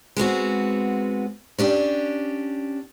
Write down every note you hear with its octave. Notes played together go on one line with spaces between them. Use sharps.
G#3 B3 C4 F#4
C#4 D4 G4